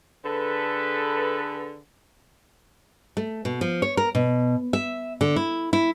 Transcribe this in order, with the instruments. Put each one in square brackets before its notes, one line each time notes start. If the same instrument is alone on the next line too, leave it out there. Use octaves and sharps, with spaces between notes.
[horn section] D3 G#4 A4 B4
[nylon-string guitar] A3
B2
F3
C#5
A#4
B2
E5
D3
E4
E4